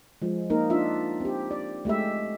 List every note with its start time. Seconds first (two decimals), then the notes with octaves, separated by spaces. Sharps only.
0.22 F3 G#3
0.50 A#3 D#4 A#4
0.70 D4 F4 E5
1.20 C4 G4
1.51 D5
1.85 G#3 A3 G4 E5